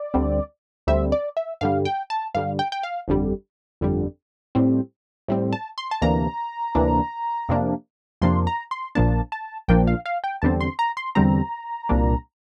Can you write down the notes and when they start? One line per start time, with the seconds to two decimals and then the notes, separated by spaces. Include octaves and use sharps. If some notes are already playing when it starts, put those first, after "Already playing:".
Already playing: D5
0.14 D2 D3 G3 C4
0.87 D2 D3 G3 C4 E5
1.12 D5
1.37 E5
1.61 G2 D3 G3 F5
1.85 G5
2.10 A5
2.34 G2 D3 G3 F5
2.59 G5
2.72 G5
2.83 F5
3.08 G1 F2 D3 G3
3.81 G1 F2 D3 G3
4.55 A2 G3 C4
5.28 A2 G3 C4
5.53 A5
5.78 C6
5.91 A5
6.02 D2 C3 E3 A#3 D4 A#5
6.75 D2 C3 E3 A#3 D4
7.49 F2 C3 F3 A#3 D4
8.22 F2 C3 F3 A#3 D4 C6
8.47 A#5
8.71 C6
8.95 A#1 A#2 F3 A#3 D4 A5
9.32 A5
9.68 A#1 A#2 F3 A#3 D4 G5
9.87 F5
10.06 F5
10.24 G5
10.42 E2 D3 G3 C4 A5
10.61 C6
10.79 A#5
10.97 C6
11.15 E2 D3 G3 C4 A#5
11.89 C2 A#2 G3 A#3 D4